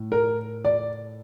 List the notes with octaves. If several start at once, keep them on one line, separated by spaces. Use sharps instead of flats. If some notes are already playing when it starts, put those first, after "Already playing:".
Already playing: A2
A#4
D5